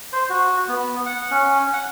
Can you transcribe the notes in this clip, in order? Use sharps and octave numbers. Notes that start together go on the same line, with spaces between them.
C5
F#4
B3
F#5
C#4
F#5